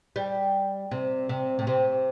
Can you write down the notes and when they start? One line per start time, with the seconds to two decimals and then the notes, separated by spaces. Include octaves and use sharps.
0.16 G3
0.91 C3
1.29 C3
1.59 A2
1.67 C3